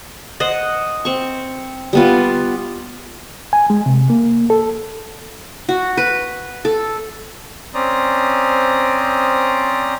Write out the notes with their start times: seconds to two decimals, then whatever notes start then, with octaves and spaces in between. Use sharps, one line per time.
0.40 C5 D#5 F#5
1.05 C4 C#6
1.93 G3 B3 F4
3.53 G#5
3.70 G#3
3.86 C3
4.10 A#3
4.50 A4
5.69 F#4
5.97 B4
6.65 A4
7.74 C4 C#4 C5 D5 A#5 D#6